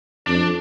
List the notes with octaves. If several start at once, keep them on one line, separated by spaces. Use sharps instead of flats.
F2 D4